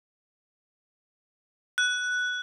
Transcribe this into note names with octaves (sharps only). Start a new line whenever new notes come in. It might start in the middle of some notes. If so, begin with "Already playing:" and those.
F#6